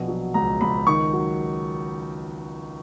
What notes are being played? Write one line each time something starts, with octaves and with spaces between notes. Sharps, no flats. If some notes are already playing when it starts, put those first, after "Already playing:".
Already playing: A#1 B2
F#3
C#2 A#5
C#2 B5
D#3 C#6
F#3